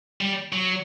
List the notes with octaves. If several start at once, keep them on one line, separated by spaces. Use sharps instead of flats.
G3
F#3